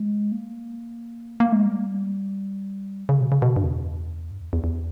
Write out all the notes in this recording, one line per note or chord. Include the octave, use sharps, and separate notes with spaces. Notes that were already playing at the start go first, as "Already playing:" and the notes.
Already playing: G#3
A#3
A#3
G#3
G3
C#3
B2
C#3
B2
G2
E2
G2
E2
E2
E2